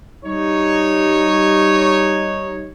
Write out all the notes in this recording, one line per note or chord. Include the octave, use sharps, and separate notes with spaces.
G3 D#4 C#5